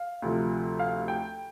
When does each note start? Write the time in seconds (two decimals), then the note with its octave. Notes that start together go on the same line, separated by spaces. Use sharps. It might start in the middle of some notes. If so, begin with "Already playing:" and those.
Already playing: F5
0.22 D2 C3 F3
0.79 F5
1.08 G5